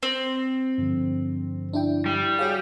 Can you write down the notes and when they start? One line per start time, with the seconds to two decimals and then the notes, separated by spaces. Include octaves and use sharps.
0.03 C4
0.78 G2 D3 F3
1.73 D4 E4 G5
2.06 G3
2.39 F#4 G#4 C#5 F5